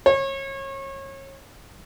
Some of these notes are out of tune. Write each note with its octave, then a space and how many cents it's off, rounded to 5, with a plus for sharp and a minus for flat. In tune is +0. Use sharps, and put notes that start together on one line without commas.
C#5 -30